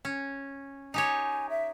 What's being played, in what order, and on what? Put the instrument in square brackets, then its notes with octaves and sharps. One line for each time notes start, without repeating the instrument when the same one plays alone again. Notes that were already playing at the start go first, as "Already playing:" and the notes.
[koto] C#4
[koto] D#4 G4 C#5 [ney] G#5
[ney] E5